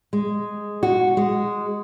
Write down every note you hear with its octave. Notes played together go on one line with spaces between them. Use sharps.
G#3
F#4
G#3